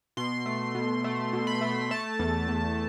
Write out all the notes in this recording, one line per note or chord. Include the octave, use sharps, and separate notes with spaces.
B2 C6
A3
B2
A3
B2
B5
A3
A3 A5
E2
E2